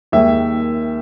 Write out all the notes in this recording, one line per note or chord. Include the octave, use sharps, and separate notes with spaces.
D#2 D#3 G#3 E5